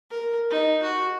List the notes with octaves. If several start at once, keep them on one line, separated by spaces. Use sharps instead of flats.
A#4
D#4
F#4